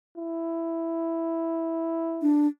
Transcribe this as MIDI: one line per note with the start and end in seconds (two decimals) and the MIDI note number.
0.17 2.35 64
2.22 2.47 62